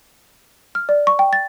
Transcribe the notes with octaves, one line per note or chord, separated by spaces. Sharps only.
F6
D5
C#6
G5
A6